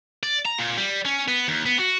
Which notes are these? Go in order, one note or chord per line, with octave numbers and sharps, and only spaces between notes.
D5
A#5
A#2
G3
C#4
B3
D#2
B3
F#4